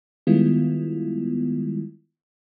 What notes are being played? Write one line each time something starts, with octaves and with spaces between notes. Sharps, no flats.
D#3 G3 G#3 B3 E4 F4